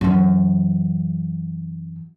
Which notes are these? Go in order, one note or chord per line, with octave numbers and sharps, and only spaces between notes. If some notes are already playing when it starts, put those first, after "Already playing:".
F#2 E3